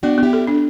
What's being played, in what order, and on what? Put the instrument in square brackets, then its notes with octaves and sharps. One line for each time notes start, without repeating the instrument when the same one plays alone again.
[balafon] B3 [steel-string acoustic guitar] D4 F#4
[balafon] B3
[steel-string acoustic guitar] E4 G4
[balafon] A4
D4